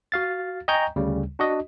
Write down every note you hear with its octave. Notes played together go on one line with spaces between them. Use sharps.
F#4 F5 A6
D#5 G5 G#5 A#5 C#6 G6
D2 C#3 G3
D4 F#4 D#5